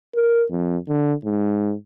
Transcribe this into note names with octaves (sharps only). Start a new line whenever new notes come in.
A#4
F2
D3
G#2